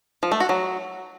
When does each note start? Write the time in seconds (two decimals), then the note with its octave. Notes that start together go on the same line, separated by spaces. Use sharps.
0.23 F3
0.32 A3
0.40 F#4
0.49 F#3